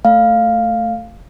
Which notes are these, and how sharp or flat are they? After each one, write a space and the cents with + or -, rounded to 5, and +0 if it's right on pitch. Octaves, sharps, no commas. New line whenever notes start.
A3 +5 F5 +0